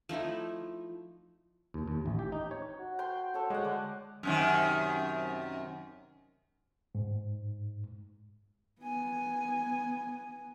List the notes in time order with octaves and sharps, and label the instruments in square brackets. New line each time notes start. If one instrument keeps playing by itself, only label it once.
[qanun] F3 A3 D#4 E4
[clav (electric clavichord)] D#2
D#2
A1
G4
D#4
C#5
[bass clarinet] F#4
[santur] G5 C6
A4 C#5
[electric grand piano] G#3 [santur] D5 F#5
[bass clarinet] D3 [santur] D5
[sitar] F#2 C3 D#3
[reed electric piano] G#2
[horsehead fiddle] B3 G#5